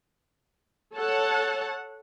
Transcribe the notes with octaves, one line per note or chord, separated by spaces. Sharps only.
A4 C#5 F#5 A5